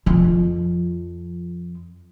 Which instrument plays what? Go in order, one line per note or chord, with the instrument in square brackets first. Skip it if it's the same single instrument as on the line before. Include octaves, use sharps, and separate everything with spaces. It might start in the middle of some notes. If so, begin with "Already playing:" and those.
[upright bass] F2 F3